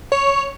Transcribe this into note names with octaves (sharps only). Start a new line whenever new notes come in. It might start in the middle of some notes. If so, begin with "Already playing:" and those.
C#5